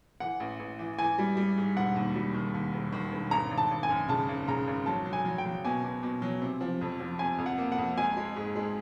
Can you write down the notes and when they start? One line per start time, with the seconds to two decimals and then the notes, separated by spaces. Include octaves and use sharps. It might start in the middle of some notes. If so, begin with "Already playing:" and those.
0.20 E3 F#5
0.40 A1
0.60 A1
0.79 E3
0.99 E3 G#5
1.18 G3
1.37 G3
1.57 G#2
1.76 E1 F#5
1.96 D#2
2.16 G3
2.34 D#3
2.54 D#2
2.74 E1
2.92 D#3
3.12 E1
3.31 G#1 A#5
3.51 G#1
3.58 A5
3.71 G#1
3.83 G#5
3.90 F#2
4.08 C#3 A5
4.29 G#1
4.48 C#3 A#5
4.67 G#1
4.86 F#3 A5
5.06 F#3
5.13 G#5
5.25 F#3
5.38 G5
5.45 F#3
5.65 B2 G#5
5.84 B2
6.03 B2
6.22 F#3
6.42 C3
6.61 F3
6.81 F2
7.00 F3
7.19 C3 G#5
7.38 F2
7.46 F#5
7.58 A#3
7.72 F#5
7.78 F2
7.97 G#3 G#5
8.17 G#3
8.36 G#2
8.56 G#3